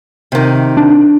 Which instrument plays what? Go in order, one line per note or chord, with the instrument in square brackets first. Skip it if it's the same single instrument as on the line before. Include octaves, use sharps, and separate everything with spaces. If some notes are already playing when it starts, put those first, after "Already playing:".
[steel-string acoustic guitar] C3 D#3
[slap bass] D4